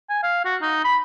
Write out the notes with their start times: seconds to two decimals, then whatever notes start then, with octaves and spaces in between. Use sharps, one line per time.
0.10 G#5
0.23 F5
0.45 F#4
0.62 D#4
0.85 B5